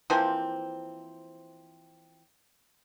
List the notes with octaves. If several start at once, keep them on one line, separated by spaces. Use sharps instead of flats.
E3 F3 A#3 C4